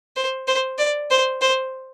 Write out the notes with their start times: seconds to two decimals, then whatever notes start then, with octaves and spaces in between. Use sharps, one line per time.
0.16 C5
0.47 C5
0.78 D5
1.10 C5
1.41 C5